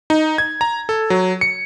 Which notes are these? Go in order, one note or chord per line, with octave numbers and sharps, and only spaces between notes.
D#4
G#6
A#5
A4
F#3
C#7